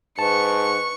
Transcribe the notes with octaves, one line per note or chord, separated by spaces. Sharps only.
G#2 B4 A5 C#6 C#7